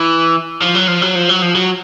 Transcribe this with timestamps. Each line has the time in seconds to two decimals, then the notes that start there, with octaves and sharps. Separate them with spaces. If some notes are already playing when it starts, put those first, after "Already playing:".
Already playing: E3
0.61 F3
0.75 F#3
0.88 F3
1.02 F#3
1.15 F3
1.29 F#3
1.42 F3
1.55 F#3